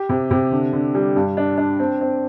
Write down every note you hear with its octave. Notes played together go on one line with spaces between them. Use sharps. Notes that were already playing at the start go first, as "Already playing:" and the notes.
Already playing: G4
C3
C3
D3
D3
G3
G2
D4
D4
C4
C4